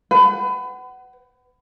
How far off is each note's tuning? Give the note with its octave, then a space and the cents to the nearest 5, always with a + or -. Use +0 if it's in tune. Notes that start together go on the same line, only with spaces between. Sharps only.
B4 +30 F#5 +25